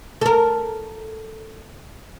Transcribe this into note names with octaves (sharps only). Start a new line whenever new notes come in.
A4 A#4